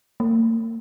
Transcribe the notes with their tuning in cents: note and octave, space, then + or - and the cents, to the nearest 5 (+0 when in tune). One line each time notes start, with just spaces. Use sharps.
A#3 -40